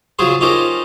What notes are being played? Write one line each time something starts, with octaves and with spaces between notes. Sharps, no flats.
C#3 F#3 F4 G#4 C5 C6
C#4 D#4 F4 G4 A#4 C5